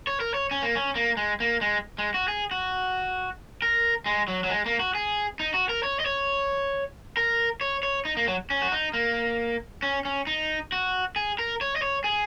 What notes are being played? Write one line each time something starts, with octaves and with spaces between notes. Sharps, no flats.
C#5
A#4
C#5
C#4
A#3
C#4
A#3
G#3
A#3
G#3
G#3
F#4
G#4
F#4
A#4
G#3
F#3
F#3
G#3
A#3
F#4
G#4
D#4
F#4
A#4
C#5
D#5
C#5
A#4
C#5
C#5
D#4
A#3
F#3
C#4
F#4
D#4
A#3
C#4
C#4
D#4
F#4
G#4
A#4
C#5
D#5
C#5
G#4